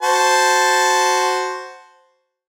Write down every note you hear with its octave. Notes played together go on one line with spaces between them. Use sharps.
F#4 C5 A5